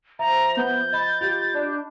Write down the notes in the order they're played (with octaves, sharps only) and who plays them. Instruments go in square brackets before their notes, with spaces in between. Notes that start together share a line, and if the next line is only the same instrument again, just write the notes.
[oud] F3 [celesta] E5 [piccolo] A#5
[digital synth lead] B3 [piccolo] G6
[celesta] D#5 B5 [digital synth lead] A6
[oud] F4 G4
[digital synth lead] D4